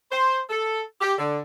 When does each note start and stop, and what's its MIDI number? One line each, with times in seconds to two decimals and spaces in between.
0.12 0.40 72
0.50 0.81 69
1.00 1.14 67
1.18 1.40 50